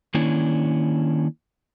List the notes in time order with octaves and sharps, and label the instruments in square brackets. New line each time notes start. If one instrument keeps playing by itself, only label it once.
[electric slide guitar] D#3 A#3 C#4 D4 E4